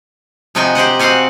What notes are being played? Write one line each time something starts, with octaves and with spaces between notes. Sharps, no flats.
C3 F3 D#4 F#4 G5 G#5
G4 C5 D#5 F#5
C4 F#4 D#5 F5 F#5 G#5